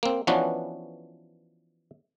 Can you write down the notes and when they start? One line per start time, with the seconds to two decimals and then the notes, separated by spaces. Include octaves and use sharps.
0.03 A#3 C4
0.27 E3 F3 B3 C#4 D4 F#4